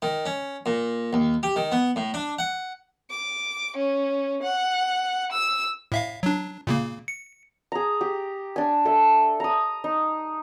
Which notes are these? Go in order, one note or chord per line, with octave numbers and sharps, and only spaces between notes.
D#3
C#4
A#2
D#2
G4
D#3
B3
A2
D4
F#5
D6
C#4
F#5
E6
A2 E5 F5
F#3 D4
A#2 C#3 A#3
C#7
G#4 A#5
G4
D4 G#5
A4 E5 A5
A#5 D#6
D#4